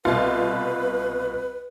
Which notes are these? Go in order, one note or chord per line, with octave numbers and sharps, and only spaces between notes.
C2 B2 F4 B4